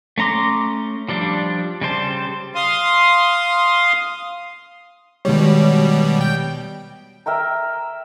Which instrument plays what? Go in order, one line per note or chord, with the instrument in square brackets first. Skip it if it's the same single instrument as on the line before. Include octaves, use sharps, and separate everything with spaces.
[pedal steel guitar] A3 C#4 A#5 C6 D6
F3 G3 D4
C#3 G3 C5 A5
[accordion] F5 C6 D#6
[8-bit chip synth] B2 G3 [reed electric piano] D#3 G#3 C#5
[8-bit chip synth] G5
[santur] A#4 E5 G5 A#5